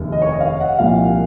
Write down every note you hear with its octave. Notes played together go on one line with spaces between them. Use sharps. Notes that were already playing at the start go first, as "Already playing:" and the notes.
Already playing: F1 D#2 C#3
D#5
C#5
D#5
F5
F#5
C2 A#2 F3 F5